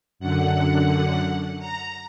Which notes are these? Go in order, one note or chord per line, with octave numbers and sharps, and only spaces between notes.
F#2 D3 F#5
A#5